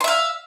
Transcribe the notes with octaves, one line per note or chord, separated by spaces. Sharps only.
E5 F5 C6